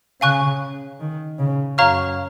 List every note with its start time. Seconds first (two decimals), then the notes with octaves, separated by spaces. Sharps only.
0.21 C#3 F5 G#5 C#6 F#6
1.00 D#3
1.39 C#3
1.78 F#2 C#5 F5 A#5 C#6 F6